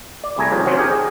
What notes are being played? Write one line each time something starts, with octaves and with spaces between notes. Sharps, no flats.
D5
C2 G3 A3 G#4 G#5 A#5
C3 D#3 F3 A#3 C#4 D#5
C3 D#3 F#3 C4 C#4
D4 G4 G#4 A#4
G#4